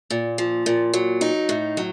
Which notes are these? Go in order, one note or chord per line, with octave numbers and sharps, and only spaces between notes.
A#2
F3
A#2
F#3
D#4
A2
F#3